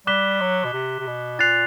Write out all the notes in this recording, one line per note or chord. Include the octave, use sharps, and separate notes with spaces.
G3 D6 F#6 B6 E7 G7
F#3
B2
C3
C3
B2
A#2 F#6 A6 C7 F7